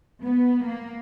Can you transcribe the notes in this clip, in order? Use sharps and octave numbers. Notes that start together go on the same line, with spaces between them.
B3
A#3